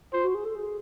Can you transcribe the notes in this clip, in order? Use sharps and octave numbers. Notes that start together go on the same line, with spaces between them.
F4 C5
F#4
G#4
A4
G#4